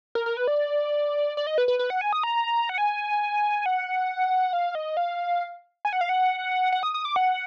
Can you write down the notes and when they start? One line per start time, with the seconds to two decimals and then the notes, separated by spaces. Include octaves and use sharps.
0.15 A#4
0.26 A#4
0.37 B4
0.47 D5
1.37 D5
1.47 D#5
1.58 B4
1.68 B4
1.79 B4
1.90 F#5
2.01 G#5
2.13 D#6
2.23 A#5
2.69 F#5
2.78 G#5
3.66 F#5
4.53 F5
4.75 D#5
4.97 F5
5.85 G#5
5.93 F#5
6.01 F5
6.09 F#5
6.72 F#5
6.83 D#6
6.94 D#6
7.05 D6
7.16 F#5